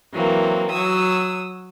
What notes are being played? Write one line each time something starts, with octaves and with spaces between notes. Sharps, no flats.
E3 F#3 A#3 C4
F#3 D#6 E6